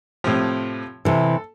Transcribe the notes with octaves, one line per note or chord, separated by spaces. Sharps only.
A2 C3 F3
C3 E3 A4